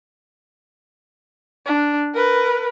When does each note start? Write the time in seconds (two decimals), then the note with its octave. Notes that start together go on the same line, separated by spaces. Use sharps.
1.66 D4
2.14 A#4 B4